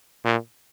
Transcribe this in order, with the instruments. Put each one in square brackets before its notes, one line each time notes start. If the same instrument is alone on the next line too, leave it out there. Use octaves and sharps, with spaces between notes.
[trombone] A#2